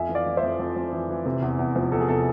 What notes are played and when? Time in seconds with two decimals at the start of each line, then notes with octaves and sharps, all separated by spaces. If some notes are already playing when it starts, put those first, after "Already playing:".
Already playing: F2 E5 G#5
0.09 E3
0.15 D5 F5
0.26 E3
0.37 C5 E5
0.43 F2
0.59 F2
0.76 F2
0.93 E3
1.09 E3
1.25 C3
1.42 E2
1.59 E2
1.75 F3
1.92 E2 A4
2.01 G#4
2.08 C3 A4